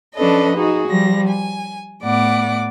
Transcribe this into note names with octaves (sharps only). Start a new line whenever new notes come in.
F3 C#4 D4 A4 B4 D#5
D#4 F#4 G#4
F3 G3 A#6
G#5
A2 B3 D5 F#5 D6